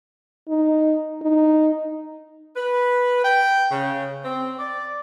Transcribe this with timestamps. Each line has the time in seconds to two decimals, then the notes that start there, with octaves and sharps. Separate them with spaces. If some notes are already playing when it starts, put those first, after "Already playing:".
0.49 D#4
1.22 D#4
2.56 B4
3.24 G5
3.71 C#3
4.25 C4
4.59 D5